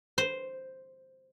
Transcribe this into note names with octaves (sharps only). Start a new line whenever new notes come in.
C5